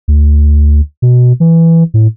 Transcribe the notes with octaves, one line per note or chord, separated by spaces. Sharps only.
D2
B2
E3
A2